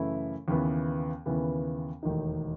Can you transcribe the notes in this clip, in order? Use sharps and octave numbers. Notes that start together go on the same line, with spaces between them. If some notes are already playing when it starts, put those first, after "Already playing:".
Already playing: F#2 C#3 E3 A3 E4
D#2 C#3 E3 B3
D#2 C#3 E3 B3
E1 D#2 D#3 A3 D#4